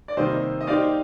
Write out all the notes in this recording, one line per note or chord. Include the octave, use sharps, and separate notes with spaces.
D5
C3 D#3 G3 A#3 C5 D#5
D#5
A#3 D#4 G4 C5 D5 F5